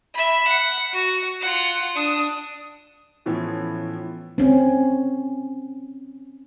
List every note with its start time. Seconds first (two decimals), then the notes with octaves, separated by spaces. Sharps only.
0.15 E5 B5
0.47 F#5
0.93 F#4
1.41 F4 F#5
1.95 D4 D#6
3.26 A2 E3 F3 B3 C#4
4.38 C4 C#4